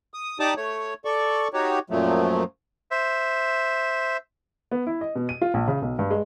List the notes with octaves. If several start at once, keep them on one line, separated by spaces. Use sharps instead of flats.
D#6
D#4 G4 D5 A5 D6 D#6
A3 C#5
A4 D5 C#6
D#4 F#4 G4 C#5
F#2 A#2 F3 F#3 A3
C5 E5
B3
E4
D#5
B2
D#7
F4
A#1
C#3
B1
G2
G#3